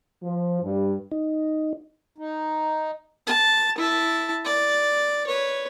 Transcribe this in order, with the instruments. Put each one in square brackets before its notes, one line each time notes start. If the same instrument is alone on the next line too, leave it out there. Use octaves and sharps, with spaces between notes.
[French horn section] F3
G2
[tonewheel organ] D#4
[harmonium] D#4
[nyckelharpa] A5
E4 A5
D5
B4 C#5